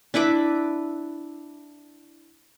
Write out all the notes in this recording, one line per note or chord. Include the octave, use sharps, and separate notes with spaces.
D4 E4 B4 D6